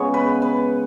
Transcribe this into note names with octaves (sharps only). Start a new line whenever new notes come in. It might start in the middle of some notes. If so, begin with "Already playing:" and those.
Already playing: C#3 G#3 B3 C#5
B4
B4